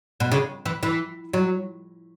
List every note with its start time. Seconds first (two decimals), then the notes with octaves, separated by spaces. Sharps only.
0.20 B2
0.32 C#3
0.66 E3
0.83 E3
1.33 F#3